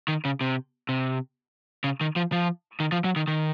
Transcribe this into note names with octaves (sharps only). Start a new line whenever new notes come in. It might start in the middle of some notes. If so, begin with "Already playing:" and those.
D#3
C#3
C3
C3
C#3
D#3
F3
F3
D#3
F3
F#3
D#3
D#3